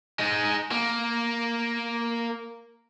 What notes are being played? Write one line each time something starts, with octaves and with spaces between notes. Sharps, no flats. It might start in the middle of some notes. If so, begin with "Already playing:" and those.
G#3 D#4
A#3